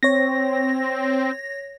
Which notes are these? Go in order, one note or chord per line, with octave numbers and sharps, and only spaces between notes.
C4 C#5 A#6